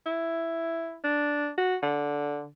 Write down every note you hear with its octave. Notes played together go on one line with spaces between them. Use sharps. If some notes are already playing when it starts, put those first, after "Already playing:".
E4
D4
F#4
D3